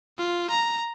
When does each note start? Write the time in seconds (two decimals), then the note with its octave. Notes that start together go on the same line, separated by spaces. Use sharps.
0.18 F4
0.50 A#5